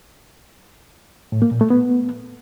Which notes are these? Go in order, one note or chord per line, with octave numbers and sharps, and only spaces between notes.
A2
A#3
A#2
A3
B3